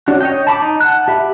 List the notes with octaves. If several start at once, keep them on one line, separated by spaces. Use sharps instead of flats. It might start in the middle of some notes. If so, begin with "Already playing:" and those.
C#4 D4 F#4
C#5 D#5 G5
A5 B5 C#6 D6
D#4
F#5 A5 F#6
G4 E5 B5